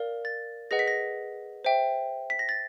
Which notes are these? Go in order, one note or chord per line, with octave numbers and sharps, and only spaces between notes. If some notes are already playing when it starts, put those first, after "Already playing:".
Already playing: A#4 D5 F5
A6
G#4 B4 D#5 F#5 A#6
B6
A#6
C5 E5 G5
B6
A#6
A6